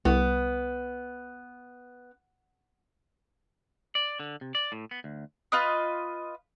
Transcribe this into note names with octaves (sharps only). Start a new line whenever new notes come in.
C2 B3
D5
D3
C3
D5
A2
B3
D2
F4 B4 D#5